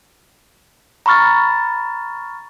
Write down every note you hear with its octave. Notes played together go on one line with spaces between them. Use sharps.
A#5 B5 C#6 F6 A6